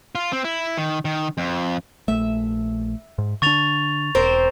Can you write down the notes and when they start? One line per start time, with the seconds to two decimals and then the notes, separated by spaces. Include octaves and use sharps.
0.15 F4
0.33 C4
0.44 E4
0.77 D#3
1.05 D#3
1.38 F2
2.08 A#1 A3 E5
3.18 G#2
3.42 D3 D4 C#6 A6 F7
4.15 E1 C4 A#4 C5